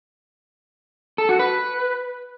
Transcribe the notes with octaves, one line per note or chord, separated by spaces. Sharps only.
A4
F#4
B4